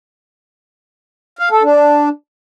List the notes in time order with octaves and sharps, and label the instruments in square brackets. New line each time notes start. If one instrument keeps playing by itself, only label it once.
[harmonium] F5
A4
D4